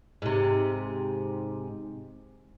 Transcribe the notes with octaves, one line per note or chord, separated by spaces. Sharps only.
G#2 C3